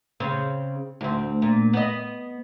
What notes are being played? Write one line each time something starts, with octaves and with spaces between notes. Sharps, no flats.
C#3 C4
D2 C4
A#2
B3 D#5